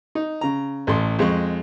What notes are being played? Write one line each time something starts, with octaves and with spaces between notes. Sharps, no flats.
D#4
C#3 A#5
A1 A4 C6
F2 G#3 G#4 C#6